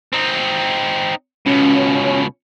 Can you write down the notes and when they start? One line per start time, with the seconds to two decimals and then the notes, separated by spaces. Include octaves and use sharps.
0.13 C4 D#4
1.46 C#2 B2 C#4